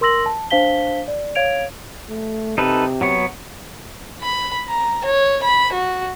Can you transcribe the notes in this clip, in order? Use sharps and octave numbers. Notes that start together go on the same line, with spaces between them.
A#4 C6 E6 A#6 F#7
A5
D4 C5 F5 A5 B6 G7
D5
C#5 F5 G#6 D7 F7
A3
C3 D#4 A4 B4
F#3 B3 C#5
B5
A#5
C#5
B5
F#4